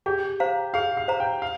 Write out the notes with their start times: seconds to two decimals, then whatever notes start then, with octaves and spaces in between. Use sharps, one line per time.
0.06 G4 G#4
0.40 C5 F5 A#5
0.74 G#4 F5
0.97 F5
1.08 C5 F5 A#5
1.20 G5
1.42 F5